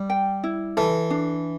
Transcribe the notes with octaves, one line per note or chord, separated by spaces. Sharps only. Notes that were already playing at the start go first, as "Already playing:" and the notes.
Already playing: G3
G5
E4
E3 A4
D4